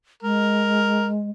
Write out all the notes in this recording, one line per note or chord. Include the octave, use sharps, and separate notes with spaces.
G#3 A#4